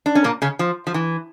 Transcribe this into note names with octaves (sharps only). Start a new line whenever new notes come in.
D4
C#4
A#2 A#3
C#3 C#4
F3
F3
E3